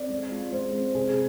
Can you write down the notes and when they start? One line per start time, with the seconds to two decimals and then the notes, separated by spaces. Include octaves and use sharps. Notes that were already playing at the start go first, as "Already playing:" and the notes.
Already playing: C4 D5
0.10 G#3
0.32 F4
0.52 G#3 C5
0.73 C4
0.95 C3 G#4